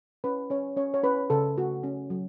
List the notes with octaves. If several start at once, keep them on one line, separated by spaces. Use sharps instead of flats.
C#4 B4
C#4 C#5
C#4 C#5
C#5
C#4 B4
C#3 A4
A3 F#4
C#4
F#3